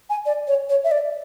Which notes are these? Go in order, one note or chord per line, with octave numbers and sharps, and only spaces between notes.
G#5
D5
C#5
C#5
E5
D5